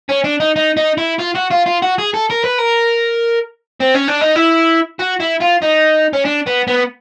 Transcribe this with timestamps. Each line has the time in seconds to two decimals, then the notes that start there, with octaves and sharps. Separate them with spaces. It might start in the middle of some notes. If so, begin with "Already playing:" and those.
0.09 C#4
0.24 D4
0.40 D#4
0.56 D#4
0.77 D#4
0.98 E4
1.19 F4
1.35 F#4
1.51 F4
1.66 F4
1.82 F#4
1.98 G#4
2.14 A4
2.30 A#4
2.44 B4
2.58 A#4
3.80 C4
3.94 C#4
4.08 D4
4.21 D#4
4.35 E4
4.99 F#4
5.20 E4
5.40 F4
5.62 D#4
6.13 C#4
6.25 D4
6.46 B3
6.67 B3